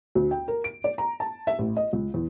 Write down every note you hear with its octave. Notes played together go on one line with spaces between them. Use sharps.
D2
G5
A#4
D7
D5
A#5
A5
E5
A1
D#5
C#2
E2